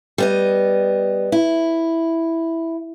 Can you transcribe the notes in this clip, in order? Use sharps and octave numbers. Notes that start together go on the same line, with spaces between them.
G3 B3 D#5
E4